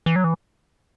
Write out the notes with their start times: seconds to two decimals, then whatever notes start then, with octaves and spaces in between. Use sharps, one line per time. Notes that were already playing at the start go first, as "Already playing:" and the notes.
0.06 E3
0.16 F#3
0.24 E3